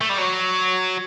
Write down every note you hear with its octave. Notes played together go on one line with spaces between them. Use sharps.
A3
G3
F#3